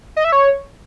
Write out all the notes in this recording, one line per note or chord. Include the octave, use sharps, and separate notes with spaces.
D#5
E5
C#5